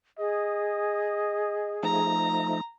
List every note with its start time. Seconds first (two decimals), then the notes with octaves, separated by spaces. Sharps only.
0.19 G#4 D#5
1.83 F3 A3 D#4 A#5